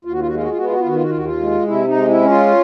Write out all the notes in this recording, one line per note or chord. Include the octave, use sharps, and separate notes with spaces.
D#2 F4
F#4
F4
F#4
G#3 F4
F#4
F4
B3 F#4
F4
F#4
F4
D#3 F#4
F4
F#4
F4
D#2 F#4
F4
G#3
C3 E4
D#4
G#3
E4
C#4
F4